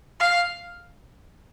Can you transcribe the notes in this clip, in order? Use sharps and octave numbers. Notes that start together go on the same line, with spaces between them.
F5